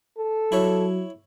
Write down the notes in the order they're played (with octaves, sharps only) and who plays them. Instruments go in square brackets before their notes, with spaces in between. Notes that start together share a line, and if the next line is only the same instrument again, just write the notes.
[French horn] A4
[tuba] F#3 [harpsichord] E4 C#5